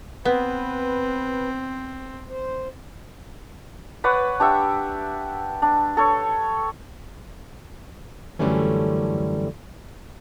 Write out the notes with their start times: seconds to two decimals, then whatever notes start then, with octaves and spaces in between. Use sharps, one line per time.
0.25 B3 C4 B4
2.29 C5
4.04 B4 C#5 D5 F#5
4.40 D4 G4 E5 F#5
5.62 D4
5.97 A4 C#5
8.39 F#2 D3 E3 G3 A3 C#4